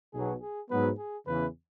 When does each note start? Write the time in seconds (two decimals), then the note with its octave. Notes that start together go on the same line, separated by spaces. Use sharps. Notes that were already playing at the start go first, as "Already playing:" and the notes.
0.14 B1 B2 F#3 G#4
0.42 G#4
0.70 G#2 F#3 B3 B4
0.98 G#4
1.27 E2 C#3 E3 B4